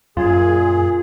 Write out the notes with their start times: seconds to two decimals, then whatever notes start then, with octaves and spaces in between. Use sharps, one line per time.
0.17 F#2 A#2 F4 G#4